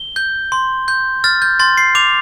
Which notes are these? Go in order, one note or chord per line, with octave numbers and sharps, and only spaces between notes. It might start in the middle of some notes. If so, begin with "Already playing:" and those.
Already playing: G7
G6
C6
G6
F6 A6
G6
C6 A6
C7
D6 F7